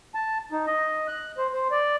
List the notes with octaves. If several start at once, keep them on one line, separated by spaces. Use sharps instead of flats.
A5
D#4
D#5
F#6
C5
C5
D5